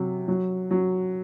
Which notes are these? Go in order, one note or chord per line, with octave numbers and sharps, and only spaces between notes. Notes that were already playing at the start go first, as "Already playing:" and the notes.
Already playing: C3 F#3
F#3
F#3